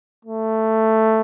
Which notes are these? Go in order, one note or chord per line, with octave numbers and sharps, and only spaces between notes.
A3